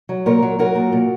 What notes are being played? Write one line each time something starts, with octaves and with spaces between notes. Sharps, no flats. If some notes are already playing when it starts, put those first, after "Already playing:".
F#3
A#2 A#4 C#5
F#3
F#3 F#4 A#4
A#2
A#2